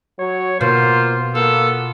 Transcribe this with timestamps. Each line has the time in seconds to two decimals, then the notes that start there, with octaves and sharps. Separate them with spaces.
0.20 F#3 C#5
0.61 B2 A#3 F4 C5
1.35 A#3 B3 F4 A4